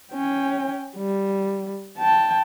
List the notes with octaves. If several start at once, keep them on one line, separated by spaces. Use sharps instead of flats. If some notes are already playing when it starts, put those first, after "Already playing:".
C#4 G5
G3
G5 A5